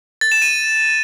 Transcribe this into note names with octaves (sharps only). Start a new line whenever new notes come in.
A6
E7
D#7